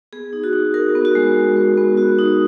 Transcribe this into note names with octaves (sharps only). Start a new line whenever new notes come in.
B3 G#4
D#4
F#4
D#4
F#4 A#4
B3
F#4
G#3
G#3
G#3
B3
F#4
D#4